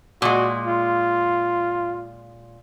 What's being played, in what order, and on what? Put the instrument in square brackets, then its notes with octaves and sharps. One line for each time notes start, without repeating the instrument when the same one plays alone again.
[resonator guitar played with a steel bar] A#2 G#3 [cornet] F#4
[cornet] F4